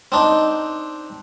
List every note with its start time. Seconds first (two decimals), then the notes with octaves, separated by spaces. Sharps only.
0.12 C4 D4 D#4